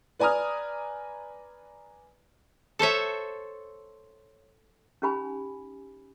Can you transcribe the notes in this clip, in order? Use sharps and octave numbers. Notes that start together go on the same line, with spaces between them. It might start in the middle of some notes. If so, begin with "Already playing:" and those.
B4 D5 G#5 A#5 D#6 F6
A4 C5 C#5 E5
C#4 D#4 G4 G#5 B5